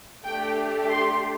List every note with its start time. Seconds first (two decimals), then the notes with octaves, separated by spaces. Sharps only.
0.25 A3 D4 G4 G5
0.88 C6